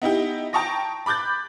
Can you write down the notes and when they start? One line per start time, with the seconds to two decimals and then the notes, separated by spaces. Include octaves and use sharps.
0.02 B3 D#4 E4 G4
0.53 G5 A5 A#5 C#6 D#6 A#6
1.06 B5 D6 F#6 G6 A6